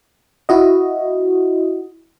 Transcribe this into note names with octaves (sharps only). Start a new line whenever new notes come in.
E4 F#4 D#5